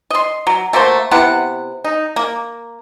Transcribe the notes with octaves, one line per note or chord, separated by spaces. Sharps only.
D#5 C6
F#3
A3 A#3 F#4 C5
C3 B3 E4 F#5
D#4
A#3